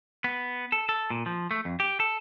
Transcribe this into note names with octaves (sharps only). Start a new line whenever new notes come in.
B3
A4
A4
A#2
F3
A3
F2
G4
A4